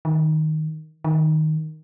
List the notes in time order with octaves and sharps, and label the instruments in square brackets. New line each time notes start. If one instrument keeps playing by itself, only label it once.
[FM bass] D#3
D#3